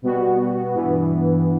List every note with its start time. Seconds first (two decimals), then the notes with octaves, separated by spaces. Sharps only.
0.02 B2 G3 B3 F#4
0.73 G2 E3 B3